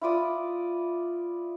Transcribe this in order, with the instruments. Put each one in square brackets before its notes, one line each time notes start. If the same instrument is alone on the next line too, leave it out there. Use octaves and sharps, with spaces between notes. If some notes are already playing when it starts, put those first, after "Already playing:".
[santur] E4 F4 D5 D#6